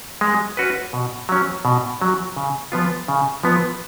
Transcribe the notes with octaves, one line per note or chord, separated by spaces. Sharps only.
G#3
C#4 F#4 B4
B2
F#3 C#4
B2
F#3 C#4
C#3
F3 B3 F4
C#3
F3 B3 F4